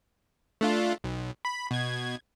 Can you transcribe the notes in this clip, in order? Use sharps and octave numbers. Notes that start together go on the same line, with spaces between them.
A3 D4 F4
B1
B5
B2 G#6